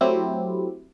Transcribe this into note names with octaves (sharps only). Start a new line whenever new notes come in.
F#3 A3 C4 E4 G4